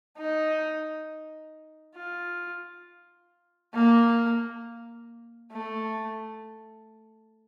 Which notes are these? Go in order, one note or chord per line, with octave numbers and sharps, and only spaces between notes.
D#4
F4
A#3
A3